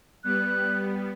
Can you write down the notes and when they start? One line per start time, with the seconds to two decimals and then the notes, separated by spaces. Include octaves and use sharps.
0.24 G3 B3 F#6